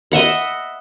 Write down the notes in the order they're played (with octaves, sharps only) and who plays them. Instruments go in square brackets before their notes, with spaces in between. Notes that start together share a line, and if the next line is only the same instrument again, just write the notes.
[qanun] D#5 E5 F#5 B5